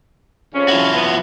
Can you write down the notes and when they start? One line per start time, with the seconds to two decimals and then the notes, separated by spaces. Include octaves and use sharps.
0.53 F2 C#3 C#4
0.68 F3 E4 F#4
0.95 B3